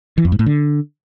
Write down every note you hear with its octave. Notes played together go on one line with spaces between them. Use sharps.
E3
F2
G#2
A2
D3